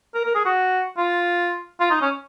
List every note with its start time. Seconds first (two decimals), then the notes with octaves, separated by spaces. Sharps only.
0.14 A#4
0.25 A#4
0.35 G#4
0.45 F#4
0.97 F4
1.80 F4
1.91 D#4
2.01 C#4